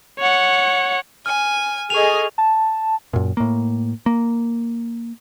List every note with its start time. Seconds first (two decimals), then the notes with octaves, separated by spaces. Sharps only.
0.19 C#5 F#5
1.26 G#5 F6
1.90 G#4 A4 D#5 G#5 C#6 F7
2.38 A5
3.13 F#2 A#2
3.37 A2 A#3
4.06 A#3